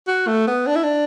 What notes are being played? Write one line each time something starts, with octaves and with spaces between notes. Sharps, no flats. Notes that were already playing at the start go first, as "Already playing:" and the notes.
F#4
A3
B3
D4
E4
D4